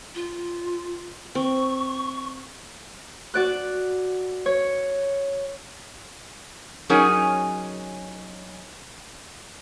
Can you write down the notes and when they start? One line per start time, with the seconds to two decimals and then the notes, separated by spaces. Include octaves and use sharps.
0.15 F4
1.35 C4 C#6
3.34 F#4 D5 F#6
4.46 C#5
6.89 F#3 C#4 D#4 G#4 A#4 C#5